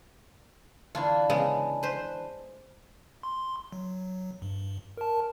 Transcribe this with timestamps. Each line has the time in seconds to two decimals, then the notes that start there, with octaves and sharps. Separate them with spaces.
0.95 D3 E3 D4 F4
1.30 C#3 G#3 B3
1.83 B4 C5
3.23 C6
3.72 F#3
4.42 G2
4.97 A#4 A5